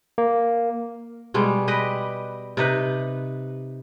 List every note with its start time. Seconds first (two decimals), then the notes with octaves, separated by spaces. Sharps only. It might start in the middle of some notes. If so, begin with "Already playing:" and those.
0.18 A#3
1.34 B2 G3 G#3
1.68 G4 B4 D#5
2.57 C3 D#4 B4